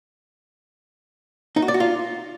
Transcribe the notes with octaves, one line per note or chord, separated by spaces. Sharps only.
D#4
F#4
D5
F#4
F4